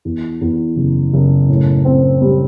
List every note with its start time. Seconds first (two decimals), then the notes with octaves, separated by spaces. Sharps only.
0.05 E2
0.41 E2
0.76 F#1
1.13 F#1
1.49 A2
1.85 C4
2.22 G3